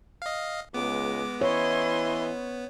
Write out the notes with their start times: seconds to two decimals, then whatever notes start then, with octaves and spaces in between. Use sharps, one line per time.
0.22 D#5 F5
0.74 C#2 G#3 B3 D6
1.41 E3 E4 C#5 D#5 C6